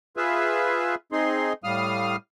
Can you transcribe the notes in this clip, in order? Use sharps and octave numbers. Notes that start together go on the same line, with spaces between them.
F4 G#4 B4 E5
C4 D#4 G#4 C6
A2 G3 F5 D#6 F6